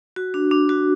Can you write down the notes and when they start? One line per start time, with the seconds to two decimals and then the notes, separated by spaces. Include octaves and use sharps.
0.16 F#4
0.34 D4
0.51 D4
0.69 F#4